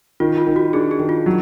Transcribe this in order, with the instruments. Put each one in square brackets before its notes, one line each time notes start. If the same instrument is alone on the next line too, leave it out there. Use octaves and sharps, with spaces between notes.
[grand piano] D#3 [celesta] F4
[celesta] F4
[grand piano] D#3
[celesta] F#4
[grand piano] D4 [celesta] G#4
[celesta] G#4
[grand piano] D#3
[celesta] F4
[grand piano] F#3